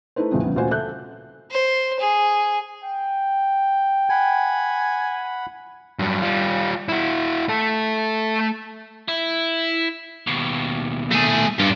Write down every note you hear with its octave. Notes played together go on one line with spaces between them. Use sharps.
A3 D#4 E4 B4 C5
E2 A2 C3 F3 G#3 C4
C#3 E3 G3 B3
D2 A#2 C#3 F#4 C5 G#5
A4 E5 F#6 G6
C5
G#4
G5
F#5 G#5 B5
G2 F#3
G3 F4
E4 F#4
A3 A4
E4
D#2 B2
A3 G#4
G2 D4 F4